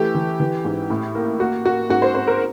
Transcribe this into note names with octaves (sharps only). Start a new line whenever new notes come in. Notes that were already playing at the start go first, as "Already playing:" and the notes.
Already playing: E3 A3 G4
E3
E3
G#2
A2
A#3
A#3 F#4
A#3 F#4
G#2 F#4
C5
C4 C5
A#4